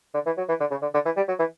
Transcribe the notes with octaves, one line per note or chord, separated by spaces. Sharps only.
D3
E3
F#3
E3
D3
C#3
D3
D3
E3
G3
F#3
E3